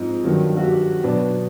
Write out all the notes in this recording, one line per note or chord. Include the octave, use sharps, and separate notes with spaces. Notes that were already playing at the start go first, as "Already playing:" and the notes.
Already playing: G#2 F3 C4 D#4
G2 D#3 F#3
F#4
G4
B2 F#3 B3 D4